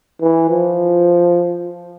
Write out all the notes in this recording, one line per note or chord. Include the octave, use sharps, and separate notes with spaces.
E3
F3